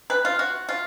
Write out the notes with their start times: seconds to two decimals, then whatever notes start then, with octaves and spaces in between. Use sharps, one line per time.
0.10 B4
0.25 F4
0.39 F#4
0.69 F4